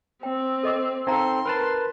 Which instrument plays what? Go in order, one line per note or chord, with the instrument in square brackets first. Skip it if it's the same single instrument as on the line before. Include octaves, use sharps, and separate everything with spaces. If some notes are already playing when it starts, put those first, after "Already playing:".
[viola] C4 [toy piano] G5
[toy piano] A4 D#5 D6
[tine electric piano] C4 A4 [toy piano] D#4 F5 A#5 [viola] C6
[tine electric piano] A#4 B4 A5 [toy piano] B5